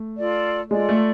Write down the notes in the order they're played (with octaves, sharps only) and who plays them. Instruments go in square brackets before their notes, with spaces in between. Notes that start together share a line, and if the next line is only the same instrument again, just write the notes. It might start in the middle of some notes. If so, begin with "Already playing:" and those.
Already playing: [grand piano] A3
[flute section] F4 A4 D5
[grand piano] G#3 [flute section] F4 A4 D5
[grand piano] A3